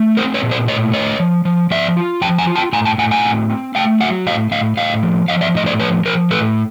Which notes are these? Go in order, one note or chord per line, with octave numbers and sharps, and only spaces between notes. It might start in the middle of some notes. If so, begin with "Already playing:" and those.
Already playing: A3
C4 A#4 C5
B4 C#5
A#2
C5 D5
A2 C#5 D#5
A3 C#5 D#5
F3
F3
F3 D5 E5
F4
F3 G5 A5
G#5 A#5
F4
G5 A5
A2 G#5 A#5
G5 A5
A2 F#5 G#5
F#5 G#5
C4
C4
A3 F5 G5
F#3 E5 F#5
A2 D#5 F5
A2 D#5 F5
A2 D#5 F5
F3
F3 D#5 F5
D5 E5
A2 D#5
C5 D5
F3 B4 C#5
F3 A#4 C5
A2 A4 B4